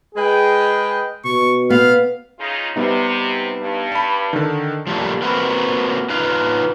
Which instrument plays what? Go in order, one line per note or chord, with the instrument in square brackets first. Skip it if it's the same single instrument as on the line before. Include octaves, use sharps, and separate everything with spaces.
[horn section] G#3 G#4 B4 D#5 G5
[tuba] B2 [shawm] C#6
[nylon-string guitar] B3 [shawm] F5
[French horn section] C#3 D#4 F4
[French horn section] C3 [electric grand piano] G3 B3 D#4
[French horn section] G2
[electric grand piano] A5 B5
D3 D#3
[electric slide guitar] F3 G3 A3 A#3
A#3 C4 F#4 A#4 B4
D#4 F4 B4 F5